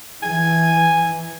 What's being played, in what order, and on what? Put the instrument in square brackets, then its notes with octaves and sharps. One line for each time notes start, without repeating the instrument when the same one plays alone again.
[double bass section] E3 [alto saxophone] G#5